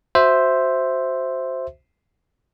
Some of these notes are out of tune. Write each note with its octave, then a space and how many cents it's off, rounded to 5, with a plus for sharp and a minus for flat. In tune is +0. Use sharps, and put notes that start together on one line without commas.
F#4 +0 C5 +0 E5 +0